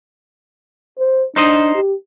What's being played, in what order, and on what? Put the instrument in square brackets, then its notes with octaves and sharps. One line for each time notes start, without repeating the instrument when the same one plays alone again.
[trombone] C5
[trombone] D4 [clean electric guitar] D#4 C5 D#5
[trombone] G4